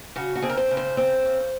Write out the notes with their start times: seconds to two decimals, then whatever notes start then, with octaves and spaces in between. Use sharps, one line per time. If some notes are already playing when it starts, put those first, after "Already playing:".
0.16 C#3 F#4
0.36 F#4
0.42 C4 G#4
0.50 A#4
0.57 C5
0.71 C#3
0.77 C5
0.97 C4 C5
1.25 C#3